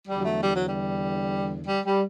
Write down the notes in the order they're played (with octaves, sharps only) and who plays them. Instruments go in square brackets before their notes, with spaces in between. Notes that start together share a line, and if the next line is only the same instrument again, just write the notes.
[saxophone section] E2 D3 F#3 G3
A3
G3
F#3
G3
G3
G3